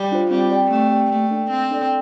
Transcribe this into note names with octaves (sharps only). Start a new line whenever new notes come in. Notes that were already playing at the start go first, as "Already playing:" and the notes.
Already playing: G3
D4 F4 C5
G3 C4
G4 D5 G5
A3 C4
G4 D5 G5
A3 A#3
D4 A4 D5 G5
A#3 C4
D4 A4 D5 G5